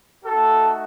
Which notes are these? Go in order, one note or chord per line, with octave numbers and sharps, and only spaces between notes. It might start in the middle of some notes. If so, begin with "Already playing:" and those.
A3 D#4 F#4 A4